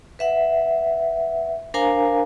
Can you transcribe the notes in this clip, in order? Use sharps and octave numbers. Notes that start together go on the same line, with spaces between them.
B4 E5 F#5
D4 A#4 C5 F5 G#5 A#5